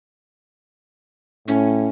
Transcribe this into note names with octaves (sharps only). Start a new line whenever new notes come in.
A2 C#4